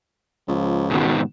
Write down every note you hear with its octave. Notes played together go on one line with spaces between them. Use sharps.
C#2 F3
G#2 B2 D#3 F#4